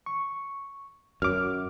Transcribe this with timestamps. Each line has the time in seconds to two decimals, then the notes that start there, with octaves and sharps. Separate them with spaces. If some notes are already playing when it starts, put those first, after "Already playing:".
0.06 C#6
1.22 F#2 D6 F6